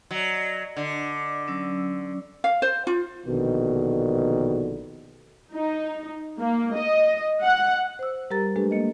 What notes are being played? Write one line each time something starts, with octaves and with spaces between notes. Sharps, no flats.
F#3 D5 D#5
D3
F#3 C#4 E6
F5
C5
F4
A#1 B2 D3 D#3
D#4
A#3
D#5
F#5
C5 E6
G3 G4 A#4 A#5 A6
G#3 A3 D4 G4 A4 B4
A#3 D#5